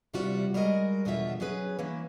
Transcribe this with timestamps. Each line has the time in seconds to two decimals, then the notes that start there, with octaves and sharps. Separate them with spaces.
0.14 E2 C3 G3 F4 F#4 F#5
0.54 G3 G#3 F#4 A#4 D#5
1.05 E2 B2 D3 F3 F4 E5
1.40 F#3 C#4 G#4 B4
1.79 E3 A#3 C#4 E4